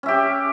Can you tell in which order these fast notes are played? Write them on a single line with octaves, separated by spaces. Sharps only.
C#4 E5 G4